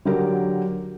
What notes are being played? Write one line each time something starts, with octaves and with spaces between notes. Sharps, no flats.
D3 F#3 G4 A#4